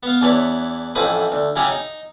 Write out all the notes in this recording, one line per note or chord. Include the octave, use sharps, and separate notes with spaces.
B3 F5
E2 D4 E4 B4 C#5 B5
A1 F2 E4 B4 C5 D#6
D2
C#3 F#3 C#4 E4 G4 G#4
D#4